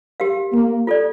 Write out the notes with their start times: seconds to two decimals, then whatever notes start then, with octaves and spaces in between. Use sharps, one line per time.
0.20 G4 A#4 F5
0.53 A#3
0.87 F4 A4 D5